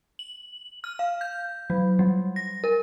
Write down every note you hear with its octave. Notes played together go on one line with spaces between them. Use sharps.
F#7
F6
F5
G6
F#3
G3
A#6
A#4